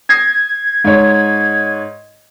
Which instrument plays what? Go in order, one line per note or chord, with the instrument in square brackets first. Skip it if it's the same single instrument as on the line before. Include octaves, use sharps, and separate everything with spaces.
[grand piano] D#6 A#6 C7 [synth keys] G#6
[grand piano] G#2 C#5